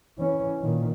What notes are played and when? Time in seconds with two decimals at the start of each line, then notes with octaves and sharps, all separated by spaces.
0.18 E3 C#4
0.62 A#2 D#3